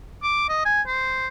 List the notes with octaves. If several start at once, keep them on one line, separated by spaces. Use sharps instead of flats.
D6
D#5
G#5
C5